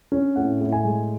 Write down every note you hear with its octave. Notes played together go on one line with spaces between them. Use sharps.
C#4
A2 F#5
A2
G#5
G#3